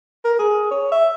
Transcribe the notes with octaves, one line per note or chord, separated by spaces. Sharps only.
A#4
G#4
C#5
E5